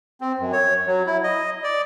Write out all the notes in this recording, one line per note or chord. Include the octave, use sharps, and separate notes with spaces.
C4
F#2
C#5
F#3
E4
D#5
D5